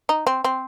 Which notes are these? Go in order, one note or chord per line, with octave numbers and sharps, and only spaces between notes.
D#4
C4
C4